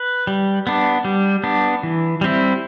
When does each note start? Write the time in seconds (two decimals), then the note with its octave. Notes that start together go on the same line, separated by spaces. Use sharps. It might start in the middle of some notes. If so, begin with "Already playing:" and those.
Already playing: B4
0.27 G3
0.67 B3 D4
1.05 G3
1.44 B3 D4
1.83 E3
2.21 G3 C4 E4